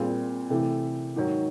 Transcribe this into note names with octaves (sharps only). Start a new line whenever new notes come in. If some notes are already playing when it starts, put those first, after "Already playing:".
Already playing: A#2 G3 C4 F4 G#4
C3 E3 A3
G#2 D#3 F#3